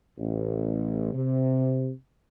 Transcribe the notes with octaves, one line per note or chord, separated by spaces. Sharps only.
A1
C3